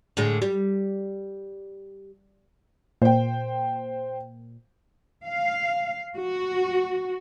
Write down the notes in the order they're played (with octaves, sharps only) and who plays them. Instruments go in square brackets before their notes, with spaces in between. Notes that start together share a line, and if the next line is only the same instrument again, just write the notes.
[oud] A2 D3 G#3
G3
[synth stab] A#2 [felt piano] C5 G5
[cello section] F5
F#4